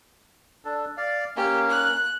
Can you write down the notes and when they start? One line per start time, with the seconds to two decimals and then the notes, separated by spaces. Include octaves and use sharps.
0.65 D4 A4
0.97 D5 F5
1.37 A#3 C#4 G4
1.70 F#6